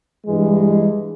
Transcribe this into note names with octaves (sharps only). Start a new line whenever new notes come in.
G2 E3 G#3